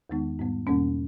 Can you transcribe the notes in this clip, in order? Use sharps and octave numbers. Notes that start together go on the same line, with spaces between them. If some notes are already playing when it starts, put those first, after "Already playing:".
E2 D#3 G#3 B3 D#4
G#2 G3 B3
E2 B2 G3 A#3 C#4